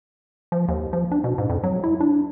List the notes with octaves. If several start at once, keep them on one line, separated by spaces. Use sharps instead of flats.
F3
D#2
F3
D4
B2
G#2
F2
F#3
E4
D4